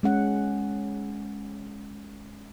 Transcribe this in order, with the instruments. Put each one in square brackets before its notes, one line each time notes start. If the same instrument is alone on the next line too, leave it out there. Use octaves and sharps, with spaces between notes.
[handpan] G#3 C#4 F#5